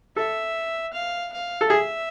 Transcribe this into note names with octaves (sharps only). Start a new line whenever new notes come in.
A4 E5
F5
F5
A4
G#4 E5